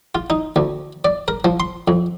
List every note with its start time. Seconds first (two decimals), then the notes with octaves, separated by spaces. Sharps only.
0.15 F4
0.30 D#4
0.56 D2
1.05 D5
1.28 A#4
1.45 F3
1.60 C6
1.88 F2